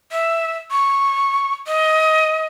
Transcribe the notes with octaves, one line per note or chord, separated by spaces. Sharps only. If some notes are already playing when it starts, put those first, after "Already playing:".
E5
C#6
D#5